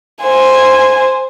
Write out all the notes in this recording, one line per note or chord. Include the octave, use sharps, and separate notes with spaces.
C5 G#5